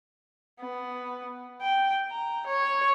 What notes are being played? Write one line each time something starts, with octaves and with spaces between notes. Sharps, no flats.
B3
G5
A#5
C#5